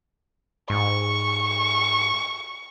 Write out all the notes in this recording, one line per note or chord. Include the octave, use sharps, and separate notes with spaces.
G#2 C#6